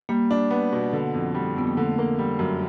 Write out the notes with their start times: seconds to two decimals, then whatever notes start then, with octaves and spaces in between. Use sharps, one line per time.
0.09 G3 A#3
0.31 D4
0.50 B3
0.72 B2
0.93 D3
1.14 F2
1.35 G3
1.56 F2 B3
1.67 A#3
1.76 D3 A3
1.98 A#3
2.19 G3
2.39 F#2